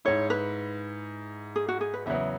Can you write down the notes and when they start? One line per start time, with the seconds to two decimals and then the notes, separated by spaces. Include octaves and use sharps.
0.05 G#2 G#3 E4 C#5
0.30 B4
1.56 G#4
1.68 F#4
1.81 G#4
1.94 B4
2.06 E2 C#3 F#3 B3 E5